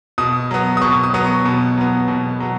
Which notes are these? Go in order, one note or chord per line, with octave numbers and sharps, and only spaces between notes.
B2 D#6
F#3 B3
D#6
B2 C#6
D#6
F#3 B3
C#6
B2
F#3 B3
B2
F#3 B3